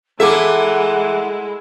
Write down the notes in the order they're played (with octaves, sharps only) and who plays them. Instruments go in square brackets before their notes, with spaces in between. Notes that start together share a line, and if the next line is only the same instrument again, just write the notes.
[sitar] E3 A#3 E5 [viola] G#3 E4 [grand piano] A4 D6 [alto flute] F#5